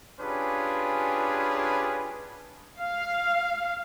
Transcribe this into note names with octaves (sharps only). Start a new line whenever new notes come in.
C#4 D4 F4 G4 G#4 B4
F5